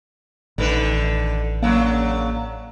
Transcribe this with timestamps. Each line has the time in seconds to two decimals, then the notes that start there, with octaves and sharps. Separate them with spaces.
0.58 A1 D3 D#3 B4
1.62 C#3 F#3 A#3 D4